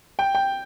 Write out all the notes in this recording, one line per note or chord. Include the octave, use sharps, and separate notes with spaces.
G5
G5